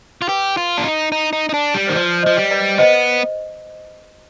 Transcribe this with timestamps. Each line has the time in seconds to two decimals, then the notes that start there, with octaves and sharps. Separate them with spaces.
0.22 F4
0.28 G4 B4
0.57 F4
0.77 D4
0.84 D#4
1.12 D#4
1.33 D#4
1.49 D#4
1.54 D4
1.74 G3
1.87 D#3 C5
1.95 F3 B4 D5
2.23 F3 C5 D#5
2.37 G3
2.51 B4 D5
2.78 B3 C5 D#5